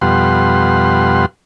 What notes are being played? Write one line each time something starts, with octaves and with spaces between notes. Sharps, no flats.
F2 B2 G3 F#5 C6